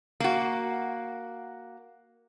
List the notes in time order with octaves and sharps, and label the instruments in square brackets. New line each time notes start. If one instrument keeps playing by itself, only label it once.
[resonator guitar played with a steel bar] A#3 F#4